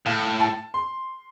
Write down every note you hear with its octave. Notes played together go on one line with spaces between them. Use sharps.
A2 F5
A5
C6